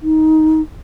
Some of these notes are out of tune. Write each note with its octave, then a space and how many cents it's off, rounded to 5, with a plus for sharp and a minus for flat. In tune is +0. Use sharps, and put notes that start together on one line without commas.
D#4 +10